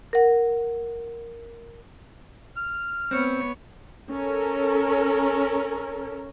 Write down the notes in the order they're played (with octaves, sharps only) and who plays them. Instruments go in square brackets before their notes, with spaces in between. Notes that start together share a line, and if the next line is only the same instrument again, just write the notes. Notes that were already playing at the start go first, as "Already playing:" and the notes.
[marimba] A#4 F#5
[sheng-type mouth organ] F6
[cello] B3 C#5 [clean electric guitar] C4
[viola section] C#4 A4 A#4